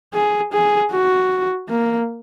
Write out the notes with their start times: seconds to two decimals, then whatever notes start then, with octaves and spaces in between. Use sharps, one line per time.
0.14 G#4
0.52 G#4
0.91 F#4
1.69 A#3